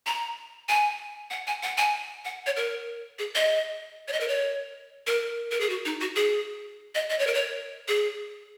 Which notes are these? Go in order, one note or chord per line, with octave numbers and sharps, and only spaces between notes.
A#5
G#5
F#5
G#5
F#5
G#5
F#5
C#5
A#4
G#4
D#5
C#5
D#5
A#4
C#5
A#4
A#4
G#4
F#4
D#4
F#4
G#4
D#5
D#5
C#5
A#4
C#5
G#4